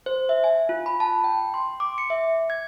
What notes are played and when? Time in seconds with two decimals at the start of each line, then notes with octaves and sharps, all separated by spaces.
0.06 C5
0.29 E5
0.44 G#5
0.69 F4
0.86 B5
1.00 A5
1.24 G5
1.54 C6
1.80 D6
1.98 C#7
2.10 E5
2.50 G#6